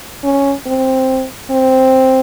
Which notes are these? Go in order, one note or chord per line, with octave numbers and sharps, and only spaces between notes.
C#4
C4
C4